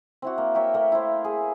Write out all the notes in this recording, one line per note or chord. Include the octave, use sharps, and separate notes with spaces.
C4 E4 F#4
A#3
A#4 C#5 E5 G5
A3 A#3 C#6
E4 C5
G#4